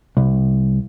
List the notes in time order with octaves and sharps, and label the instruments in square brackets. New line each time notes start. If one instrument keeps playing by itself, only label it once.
[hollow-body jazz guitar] C2